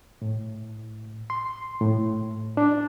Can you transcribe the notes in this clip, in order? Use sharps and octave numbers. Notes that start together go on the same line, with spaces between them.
A2
C6
A2
D4